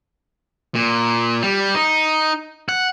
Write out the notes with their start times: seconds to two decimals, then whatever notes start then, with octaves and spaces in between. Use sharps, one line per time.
0.75 A#2
1.42 G3
1.75 D#4
2.69 F#5